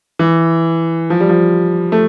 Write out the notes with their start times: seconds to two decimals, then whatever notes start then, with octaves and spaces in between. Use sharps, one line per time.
0.19 E3
1.10 F3
1.20 G3
1.29 F3
1.92 A3